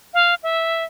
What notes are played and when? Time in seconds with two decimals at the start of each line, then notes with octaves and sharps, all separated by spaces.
0.14 F5
0.43 E5